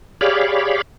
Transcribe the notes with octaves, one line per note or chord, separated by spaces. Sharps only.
G4 G#4 C#5 D5 F5 B5